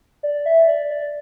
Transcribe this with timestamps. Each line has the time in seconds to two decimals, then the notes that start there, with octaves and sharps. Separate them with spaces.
0.23 D5
0.46 E5
0.68 D5
0.90 D5